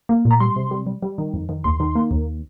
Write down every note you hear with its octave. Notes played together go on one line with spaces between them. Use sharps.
A#3
A#2
A#5
G3 C6
C3
G3
G3
G3
D#3
F2
D#3
D#2 C6
D#3
A#3
D#2